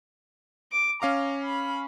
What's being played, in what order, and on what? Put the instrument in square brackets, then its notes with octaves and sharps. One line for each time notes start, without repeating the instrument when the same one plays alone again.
[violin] D6
[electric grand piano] C#4 F5 D6 [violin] A#5
[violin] B5